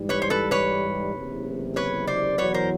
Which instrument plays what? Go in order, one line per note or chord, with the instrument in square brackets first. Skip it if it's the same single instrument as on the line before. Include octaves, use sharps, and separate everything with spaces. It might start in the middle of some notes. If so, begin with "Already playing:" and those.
Already playing: [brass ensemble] G#2 E3 G3
[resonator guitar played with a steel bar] B4 C#5
C5
A4 B4
B4 C#5
[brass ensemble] F#1 E2 C3
[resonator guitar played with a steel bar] B4 C#5
C5 D5
[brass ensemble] E2 B2 F#3 [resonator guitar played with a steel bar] B4 C#5
[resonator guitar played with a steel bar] A#4 C5